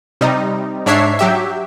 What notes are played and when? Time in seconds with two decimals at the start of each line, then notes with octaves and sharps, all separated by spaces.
0.21 C3 G3 D#4
0.86 G#2 D4 C#5 E5 C7
1.19 F#3 G4 E5